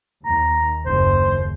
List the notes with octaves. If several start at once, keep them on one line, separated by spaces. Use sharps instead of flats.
D#2 A#5
F#1 D#2 C5